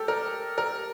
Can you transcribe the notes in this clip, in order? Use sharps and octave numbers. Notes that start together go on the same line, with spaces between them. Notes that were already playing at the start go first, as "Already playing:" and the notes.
Already playing: G4 A4
A#4
A#4